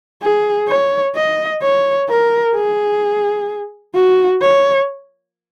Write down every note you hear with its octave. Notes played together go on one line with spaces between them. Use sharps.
G#4
C#5
D#5
C#5
A#4
G#4
F#4
C#5